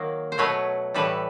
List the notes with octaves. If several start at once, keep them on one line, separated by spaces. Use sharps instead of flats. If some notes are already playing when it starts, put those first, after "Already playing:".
Already playing: D#3 F#3 A#3
C5
B2 F#3 A3 B4 C#5
A2 E3 G3 A4 B4